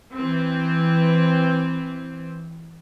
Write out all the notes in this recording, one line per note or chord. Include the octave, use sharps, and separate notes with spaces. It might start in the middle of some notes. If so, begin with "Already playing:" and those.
E3 C4